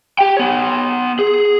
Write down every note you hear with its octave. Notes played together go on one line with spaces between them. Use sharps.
G4 G5
B3 C#5
G#4